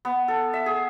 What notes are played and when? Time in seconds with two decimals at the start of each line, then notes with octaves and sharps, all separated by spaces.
0.05 B3
0.28 A4
0.54 E5
0.66 G#4